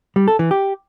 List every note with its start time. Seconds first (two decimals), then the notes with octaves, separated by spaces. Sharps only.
0.16 G3
0.28 A4
0.39 E3
0.51 G4